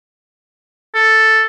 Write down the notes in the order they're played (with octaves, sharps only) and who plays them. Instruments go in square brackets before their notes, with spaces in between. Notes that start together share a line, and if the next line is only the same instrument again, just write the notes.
[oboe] A4